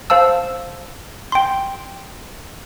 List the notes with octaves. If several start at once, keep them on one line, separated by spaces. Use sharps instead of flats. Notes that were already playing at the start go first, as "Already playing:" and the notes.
C5 F5 A5 E6
G5 C6